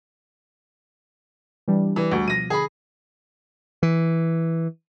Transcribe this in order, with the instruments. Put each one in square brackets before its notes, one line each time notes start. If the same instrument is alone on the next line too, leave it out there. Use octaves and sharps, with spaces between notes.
[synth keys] E3 G3 D4
[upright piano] E3 [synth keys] G3
[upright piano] D2
[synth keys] B2 F3 [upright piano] A#6 D#7
[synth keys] D3 [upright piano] G#4 B5
[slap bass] E3